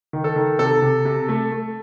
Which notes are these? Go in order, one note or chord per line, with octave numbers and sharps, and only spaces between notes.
D#3
A4
D#3
C3 A4
C3
C3
A3
A3